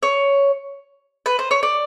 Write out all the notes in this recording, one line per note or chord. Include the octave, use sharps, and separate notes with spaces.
C#5
B4
C5
C#5
D5